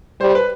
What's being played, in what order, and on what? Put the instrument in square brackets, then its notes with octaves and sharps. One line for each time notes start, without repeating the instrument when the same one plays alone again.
[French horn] G3 [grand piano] C5
[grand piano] B4